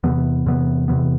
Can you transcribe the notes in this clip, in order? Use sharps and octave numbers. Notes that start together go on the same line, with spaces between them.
E2 C3 E3 B3
E2 C3 E3 B3
E2 C3 E3 B3